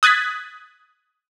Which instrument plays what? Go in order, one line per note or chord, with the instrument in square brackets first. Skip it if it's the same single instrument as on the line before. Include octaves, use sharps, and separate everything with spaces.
[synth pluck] D#6 F#6 G#6 A6 B6